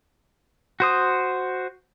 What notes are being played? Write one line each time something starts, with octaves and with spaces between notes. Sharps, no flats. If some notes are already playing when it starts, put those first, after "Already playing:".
F#4 C5 D#6